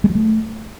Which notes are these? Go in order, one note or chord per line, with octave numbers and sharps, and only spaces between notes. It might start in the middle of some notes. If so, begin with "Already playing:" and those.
G#3
F#3
A3